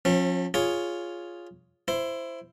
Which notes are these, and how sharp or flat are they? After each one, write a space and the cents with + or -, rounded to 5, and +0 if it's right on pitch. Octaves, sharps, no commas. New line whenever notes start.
F3 +35 C#4 -35
F4 +0 G#4 +0 C#5 +10
E4 +15 C5 +0